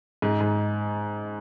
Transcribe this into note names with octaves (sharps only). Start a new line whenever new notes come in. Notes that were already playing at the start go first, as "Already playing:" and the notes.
G#2
G#2